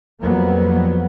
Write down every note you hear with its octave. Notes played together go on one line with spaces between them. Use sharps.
F2 F#3 G3 A#3 B3